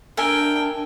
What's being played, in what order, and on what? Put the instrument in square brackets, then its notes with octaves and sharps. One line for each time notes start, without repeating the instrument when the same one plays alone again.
[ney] D4 [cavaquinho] A#4 E5 G#5 [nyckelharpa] G5